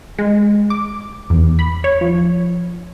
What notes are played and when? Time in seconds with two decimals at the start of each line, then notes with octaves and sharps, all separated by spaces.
0.19 G#3
0.70 D6
1.30 E2
1.59 B5
1.84 C#5
2.01 F3